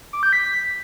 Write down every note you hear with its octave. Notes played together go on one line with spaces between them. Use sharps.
D6
G6
B6